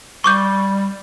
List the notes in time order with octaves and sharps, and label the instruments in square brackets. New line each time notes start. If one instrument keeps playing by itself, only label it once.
[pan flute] G3 [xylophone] C#6 D6 G6